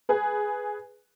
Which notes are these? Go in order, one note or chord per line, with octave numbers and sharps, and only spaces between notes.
G#4 B4